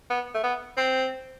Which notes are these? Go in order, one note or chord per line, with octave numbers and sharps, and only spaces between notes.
B3
A3
B3
C4